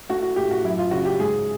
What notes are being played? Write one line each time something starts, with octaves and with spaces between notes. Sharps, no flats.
A3 F#4
F#4
A2 G4
F#4
F#2 E4
F4
C#3 F#4
G4
G#2 G#4